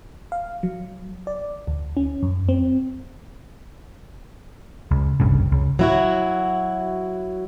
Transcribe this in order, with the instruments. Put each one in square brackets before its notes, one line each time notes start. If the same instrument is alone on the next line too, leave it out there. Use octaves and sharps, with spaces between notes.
[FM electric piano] F5
F#3
D5
D2
C#4
F#2
C4
[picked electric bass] C#2
F#1 C2 G2 C#3
C#2
[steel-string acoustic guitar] F#3 E4 F#4